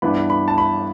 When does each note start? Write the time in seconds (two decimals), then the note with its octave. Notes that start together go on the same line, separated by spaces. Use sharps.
0.02 G2 E3 B3 D4 B5
0.30 B5
0.48 A5
0.58 B5